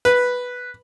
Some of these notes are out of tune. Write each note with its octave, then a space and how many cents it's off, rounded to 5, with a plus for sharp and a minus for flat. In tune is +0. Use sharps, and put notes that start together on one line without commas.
B4 -5